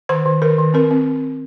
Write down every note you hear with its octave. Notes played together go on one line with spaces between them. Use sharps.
D#3 C5
D#3
D#3 A#4
D#3
C4 A#4
C4